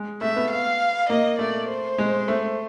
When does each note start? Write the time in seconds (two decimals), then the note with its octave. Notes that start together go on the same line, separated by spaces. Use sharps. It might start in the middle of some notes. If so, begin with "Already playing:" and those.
Already playing: G#3
0.21 A3 E5
0.36 B3
0.50 F5
1.09 A#3 D#5
1.39 A3 D5
1.69 C5
1.98 G#3
2.28 A3